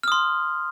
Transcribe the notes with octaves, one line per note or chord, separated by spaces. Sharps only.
C6 D#6 F6